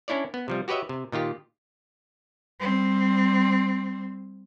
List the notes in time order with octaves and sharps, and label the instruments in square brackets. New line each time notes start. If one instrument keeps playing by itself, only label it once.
[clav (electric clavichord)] C#4 D4 E4 C#5 D5
B3
C3 F3 G3
F#4 G4 B4 C#5 D#5 E5
C3
A#2 D#3 F4 G4
[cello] G3 C4